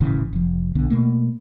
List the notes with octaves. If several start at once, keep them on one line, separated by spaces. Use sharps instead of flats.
D#1 A1 C#3 E3
F1 F3
B1 D3 B3
B2 A3 A#3